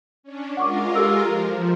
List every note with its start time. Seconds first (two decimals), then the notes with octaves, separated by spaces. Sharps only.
0.23 C#4 D4
0.57 G#3 F4 A#4 F#5 C#6 D6
0.96 G4 A4 E6
1.26 F3 A#5